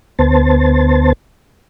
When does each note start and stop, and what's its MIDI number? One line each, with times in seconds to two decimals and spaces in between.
0.19 1.13 38
0.19 1.13 59
0.19 1.13 72
0.19 1.13 81